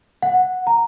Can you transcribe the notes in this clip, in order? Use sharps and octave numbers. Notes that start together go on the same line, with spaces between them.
F#5
A#5